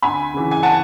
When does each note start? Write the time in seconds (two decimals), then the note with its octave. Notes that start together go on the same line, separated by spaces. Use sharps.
0.02 D2 G#5 B5
0.33 C#3 E3
0.51 G#5
0.63 F#5 A5